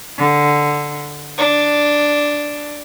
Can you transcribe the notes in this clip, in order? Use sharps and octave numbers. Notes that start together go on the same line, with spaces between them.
D3
D4